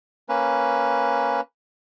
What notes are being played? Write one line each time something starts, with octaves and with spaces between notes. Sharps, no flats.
A#3 C#4 B4